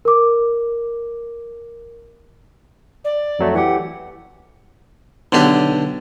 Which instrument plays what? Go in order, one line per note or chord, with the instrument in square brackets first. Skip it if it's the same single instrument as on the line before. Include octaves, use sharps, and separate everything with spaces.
[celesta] A#4 D6
[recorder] D5
[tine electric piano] F2 F#3 A3
[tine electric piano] E3 G4 [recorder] F#5
[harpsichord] B1 D3 D4 G4